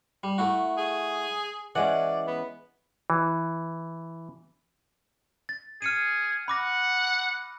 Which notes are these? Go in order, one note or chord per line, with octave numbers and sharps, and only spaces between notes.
G3
A3 E4 F#4
G#4
E3 G#3 C#4 D5 F#5
B3
E3
A6
G#4 F6 C#7 D#7
F#5 B5 D6 A#6